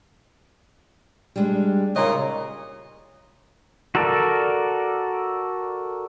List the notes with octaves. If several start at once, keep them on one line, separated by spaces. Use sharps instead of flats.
G3 G#3 D4
A#2 C#3 D#4 D#5
F#4 A4 A#4 D5